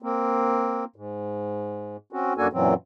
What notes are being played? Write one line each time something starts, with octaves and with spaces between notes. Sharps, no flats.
A#3 C4
G#2
C4 C#4 F#4
F#2 A#3 D4 F#4 A4 G#5
F#2 A#2 E3 F#3 C4